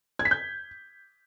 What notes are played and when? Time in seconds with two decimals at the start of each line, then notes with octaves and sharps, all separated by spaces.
0.19 G#6
0.25 B6
0.31 G6